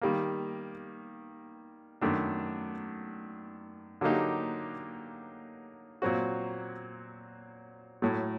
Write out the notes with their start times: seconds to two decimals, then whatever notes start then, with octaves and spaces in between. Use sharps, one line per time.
0.02 D#3 G3 A#3
2.01 F#2 D#3 A3 D4
4.01 D3 F#3 A#3 D#4 G4
6.02 A#2 F#3 C4 F#4
8.02 A2 F#3 A3